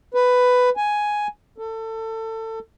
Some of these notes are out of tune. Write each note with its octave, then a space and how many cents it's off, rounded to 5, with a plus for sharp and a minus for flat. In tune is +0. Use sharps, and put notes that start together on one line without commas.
B4 +10
G#5 +5
A4 +25